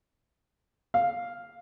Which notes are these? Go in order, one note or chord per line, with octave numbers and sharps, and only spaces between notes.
F5